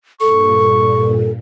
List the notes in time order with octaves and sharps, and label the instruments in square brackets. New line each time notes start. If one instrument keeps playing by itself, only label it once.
[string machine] G2 A#2 [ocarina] A4 [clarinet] C#6